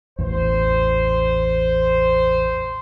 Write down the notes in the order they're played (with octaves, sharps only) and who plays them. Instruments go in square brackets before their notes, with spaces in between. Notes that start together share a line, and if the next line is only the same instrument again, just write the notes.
[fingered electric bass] A1 E2 [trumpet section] C5